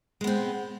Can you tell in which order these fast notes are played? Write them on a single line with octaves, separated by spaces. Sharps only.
G#3 B3 C4